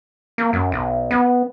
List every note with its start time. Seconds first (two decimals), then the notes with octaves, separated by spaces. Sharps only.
0.38 A#3
0.53 F#2
0.72 B1
1.11 B3